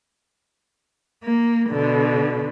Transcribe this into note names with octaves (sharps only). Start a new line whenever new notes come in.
A#3
B2 D3